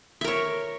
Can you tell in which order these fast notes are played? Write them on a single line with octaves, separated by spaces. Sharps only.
E5 A#4 C#5